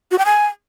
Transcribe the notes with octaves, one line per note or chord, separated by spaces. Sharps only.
F#4
G5
G#5